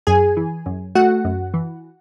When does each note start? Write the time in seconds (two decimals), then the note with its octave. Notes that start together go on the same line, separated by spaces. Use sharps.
0.07 F#2 G#4 G#5
0.37 E3
0.66 F#2
0.95 A3 F#4 F#5
1.25 F#2
1.54 E3